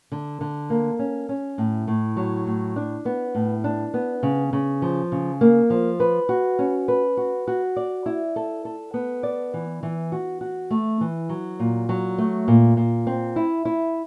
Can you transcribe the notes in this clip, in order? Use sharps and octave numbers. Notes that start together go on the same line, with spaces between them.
D3
D3
A#3
C#4
C#4
A2
A2
F#3
A2
D4
B3
A2
D4
B3
C#3
C#3
F3
C#3
A#3
F3
B4
F#4
C#4
B4
F#4
F#4
D5
E4
A4
A4
B3
D5
E3
E3
F#4
F#4
A3
E3
F#3
A#2
F#3
A3
A#2
A#2
C4
E4
E4